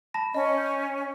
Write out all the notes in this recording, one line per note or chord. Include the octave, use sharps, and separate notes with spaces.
A5 B5 A#6
C#4 D#5
G6